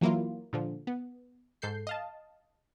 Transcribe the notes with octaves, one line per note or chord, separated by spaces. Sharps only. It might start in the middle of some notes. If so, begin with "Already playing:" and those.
E3 F#3 A#3 E4 F4
A#2 D3 F3
B3
G#2 A4 G6 C7
D#5 F5 A5